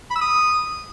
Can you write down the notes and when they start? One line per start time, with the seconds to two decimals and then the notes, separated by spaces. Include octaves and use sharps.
0.10 B5
0.16 E6
0.21 D#6